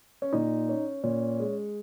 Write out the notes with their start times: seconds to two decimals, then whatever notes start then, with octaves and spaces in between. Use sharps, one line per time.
0.22 C#4
0.33 A#2 D#4
0.69 C#4
1.04 A#2 C#4
1.40 G#3